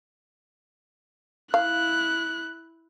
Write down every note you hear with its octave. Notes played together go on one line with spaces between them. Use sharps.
E4 F5 F#6